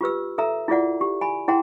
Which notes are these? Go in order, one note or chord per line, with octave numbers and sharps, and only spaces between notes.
F4 G4 B4 E6
A4 E5 A#5 E6
E4 F4 G#4 D5 F#5
G4
G#5 B5
E4 G#4 F#5 G5 A#5 C6